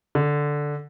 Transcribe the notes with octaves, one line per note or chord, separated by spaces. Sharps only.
D3